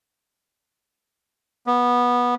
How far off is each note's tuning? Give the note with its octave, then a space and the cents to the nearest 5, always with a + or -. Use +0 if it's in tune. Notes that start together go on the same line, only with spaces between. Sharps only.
B3 -15